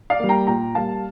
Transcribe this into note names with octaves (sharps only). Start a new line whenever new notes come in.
D5 F5
G3 A#3
G5 A#5
A#2 G5 A#5
G3 A#3 F5 A5